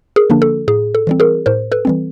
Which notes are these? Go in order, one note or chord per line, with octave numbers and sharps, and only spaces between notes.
G#4 A#4
D3 F3 A#3 D4
A4
A2 G#4
A4
E3 G3 C4
G#4 A#4
A2 A#4 C5
A4 B4
E3 G3 C4